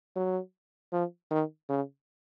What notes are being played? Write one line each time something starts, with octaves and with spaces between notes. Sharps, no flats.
F#3
F3
D#3
C#3